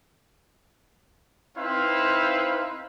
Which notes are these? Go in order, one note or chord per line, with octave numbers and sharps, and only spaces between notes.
C4 D#4 E4 B4 C5 F5